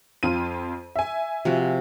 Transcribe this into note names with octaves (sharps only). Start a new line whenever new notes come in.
F2 F4 D#7
E5 G#5
C3 F3 F#4